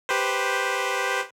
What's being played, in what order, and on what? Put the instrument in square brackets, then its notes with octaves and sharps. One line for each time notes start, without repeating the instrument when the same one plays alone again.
[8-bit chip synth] G4 B4 C5